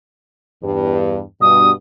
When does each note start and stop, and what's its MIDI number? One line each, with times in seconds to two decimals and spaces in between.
0.63 1.21 40
0.63 1.21 43
1.41 1.72 43
1.41 1.72 47
1.41 1.71 87